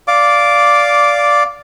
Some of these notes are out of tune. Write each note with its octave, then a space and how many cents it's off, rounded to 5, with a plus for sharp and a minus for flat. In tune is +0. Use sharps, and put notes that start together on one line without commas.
D5 -10 F5 +0 D6 -5